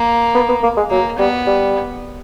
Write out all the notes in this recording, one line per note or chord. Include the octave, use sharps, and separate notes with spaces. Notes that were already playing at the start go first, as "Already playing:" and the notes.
Already playing: A#3
B3
B3
A#3
G#3
F#3 A#3
G3 B3
G3